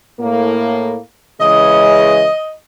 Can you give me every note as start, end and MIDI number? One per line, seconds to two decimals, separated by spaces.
0.20 0.95 45
0.20 0.95 58
1.41 2.27 49
1.41 2.27 52
1.41 2.27 56
1.41 2.54 75